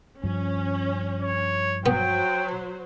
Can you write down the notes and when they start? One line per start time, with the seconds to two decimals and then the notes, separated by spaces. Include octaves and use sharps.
0.24 G2 F3 C#4
1.22 C#5
1.86 F#3 B3 C5 G5